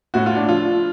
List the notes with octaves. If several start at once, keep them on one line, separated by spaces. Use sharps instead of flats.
A2 F#4
F4
D4
F3 F4